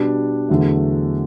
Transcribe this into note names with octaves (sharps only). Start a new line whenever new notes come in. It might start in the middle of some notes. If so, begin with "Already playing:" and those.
Already playing: B2 G3 D4
E2 D3 F#3 A3